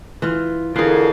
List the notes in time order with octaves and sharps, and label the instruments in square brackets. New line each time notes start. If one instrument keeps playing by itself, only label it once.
[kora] E3 F4
[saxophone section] F2 F5 [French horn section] D3 F4 A#4 [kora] E3 G#4